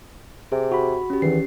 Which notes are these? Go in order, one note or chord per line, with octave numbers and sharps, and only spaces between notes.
C3 G#4
F#4 B5
C#4 G4
E2 D#3 E3 C7